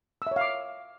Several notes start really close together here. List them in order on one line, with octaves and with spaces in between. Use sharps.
E6 E5 C#5 F5 D6